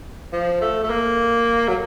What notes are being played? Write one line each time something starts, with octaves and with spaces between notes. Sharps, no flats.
F3
A3
A3
A#3
F#3